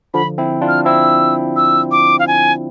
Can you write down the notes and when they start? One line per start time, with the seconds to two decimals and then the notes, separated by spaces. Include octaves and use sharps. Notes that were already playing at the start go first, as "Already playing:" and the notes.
0.14 D3 F3 B5
0.38 C4 E4
0.61 D4 F4
0.68 F6
0.85 C4 E4 E6
1.56 E6
1.91 D6
2.19 F5
2.27 G#5